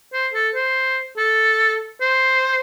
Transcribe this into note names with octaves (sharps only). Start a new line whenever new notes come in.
C5
A4
C5
A4
C5